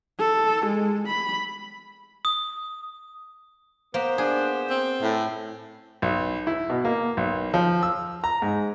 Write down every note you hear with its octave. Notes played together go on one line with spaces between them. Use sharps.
A4
G#3
B5
D#6
A#3 B3 C5
D4 G#4
C4
A2 C#4 E4 A4
B1
E4
B2
A#3
B1
F3
E6
A#5
G#2